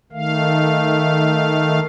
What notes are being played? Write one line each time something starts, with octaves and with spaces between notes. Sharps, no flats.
D#3 A3 F5